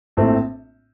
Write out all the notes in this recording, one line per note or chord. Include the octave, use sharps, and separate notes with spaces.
A#1 A2 A3 C4